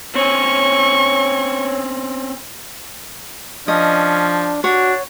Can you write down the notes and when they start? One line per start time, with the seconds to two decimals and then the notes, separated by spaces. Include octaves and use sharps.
0.15 C4 C#4 C#5 C#6
3.68 F3 C#4 D4 D#5
4.64 D4 F#4 C#5 F#5